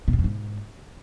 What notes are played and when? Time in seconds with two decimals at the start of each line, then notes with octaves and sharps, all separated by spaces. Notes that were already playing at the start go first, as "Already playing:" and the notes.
0.08 B2
0.13 F#2
0.19 F2
0.24 G#2